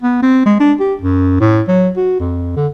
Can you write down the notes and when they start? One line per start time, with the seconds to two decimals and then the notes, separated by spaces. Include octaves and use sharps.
0.03 B3
0.23 C4
0.46 G#3
0.60 D4
0.80 G4
1.02 F#2
1.40 A2
1.68 F#3
1.97 F#4
2.20 F2
2.56 D3